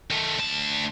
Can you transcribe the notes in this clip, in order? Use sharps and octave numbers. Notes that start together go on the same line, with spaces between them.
D#3 A3
D2 A5